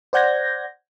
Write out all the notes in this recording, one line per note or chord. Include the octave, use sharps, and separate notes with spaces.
C5 D5 F#5 G6 G#6 A#6